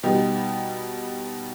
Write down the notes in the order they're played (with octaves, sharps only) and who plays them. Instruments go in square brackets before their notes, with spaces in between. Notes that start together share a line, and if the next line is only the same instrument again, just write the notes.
[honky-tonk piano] B2 G3 B3 D#4 G4